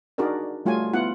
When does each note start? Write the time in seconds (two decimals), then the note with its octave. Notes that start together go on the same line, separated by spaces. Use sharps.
0.18 D4 D#4 F#4 G#4 A#4 D5
0.66 G3 A3 F4 F#4 C#5 G#5
0.93 B3 E4 F4 F#5